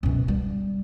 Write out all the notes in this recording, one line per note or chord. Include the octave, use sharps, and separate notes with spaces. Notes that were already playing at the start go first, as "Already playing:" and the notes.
F#2 B2
G3